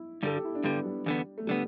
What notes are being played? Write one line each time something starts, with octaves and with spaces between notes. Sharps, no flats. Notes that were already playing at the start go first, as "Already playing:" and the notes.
Already playing: E4
G2 D3 G3 A4
G4
E4
D4
G2 D3 G3 B3
G3
E2 D3 B3
A3
D3 G3 B3